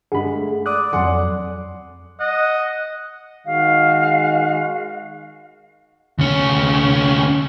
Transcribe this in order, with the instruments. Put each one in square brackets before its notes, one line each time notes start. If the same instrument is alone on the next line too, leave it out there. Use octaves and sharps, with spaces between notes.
[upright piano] G2 D3 G#3 [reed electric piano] G#4 [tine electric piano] F#5 B5
[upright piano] A3
[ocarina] D5 [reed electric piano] D6 D#6 F#6
[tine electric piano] F2 F#3 A4 [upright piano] F#5 G#5 C6
[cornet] D#5 [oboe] F#5
[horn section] D#3 G#3 F#4 [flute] F5
[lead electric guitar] D2 C#4